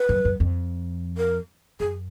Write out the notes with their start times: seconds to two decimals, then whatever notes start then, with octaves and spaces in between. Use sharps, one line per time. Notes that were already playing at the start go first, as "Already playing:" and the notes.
Already playing: B4
0.09 F#2
0.25 F#2
0.40 F2
1.18 A#4
1.80 F#2 G#4